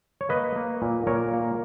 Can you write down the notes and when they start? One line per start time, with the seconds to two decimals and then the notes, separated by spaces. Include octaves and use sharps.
0.21 C#5
0.29 A#3 B4 D#5
0.56 A#3
0.82 A#2
1.07 A#2 A#4 C#5
1.33 A#3